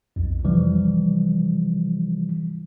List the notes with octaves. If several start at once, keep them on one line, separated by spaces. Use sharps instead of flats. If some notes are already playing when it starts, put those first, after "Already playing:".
B1 F2
C3 E3 F3 G3